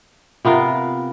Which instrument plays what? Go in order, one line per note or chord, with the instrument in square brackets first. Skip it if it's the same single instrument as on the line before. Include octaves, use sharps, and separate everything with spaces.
[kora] C3 B3 F4 A#4